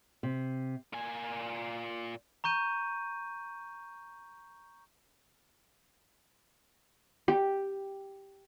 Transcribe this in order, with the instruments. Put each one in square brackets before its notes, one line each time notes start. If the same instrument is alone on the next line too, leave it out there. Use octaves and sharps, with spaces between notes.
[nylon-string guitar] C3
[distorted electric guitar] A#2 G#5
[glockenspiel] A#5 C#6 G6 D#7
[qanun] G4